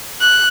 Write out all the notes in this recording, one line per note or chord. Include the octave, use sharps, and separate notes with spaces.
F#6